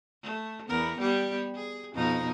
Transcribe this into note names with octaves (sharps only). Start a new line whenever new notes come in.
A3
E2 B3 A#4
G3 B3 G4
G#4
F2 B2 D#4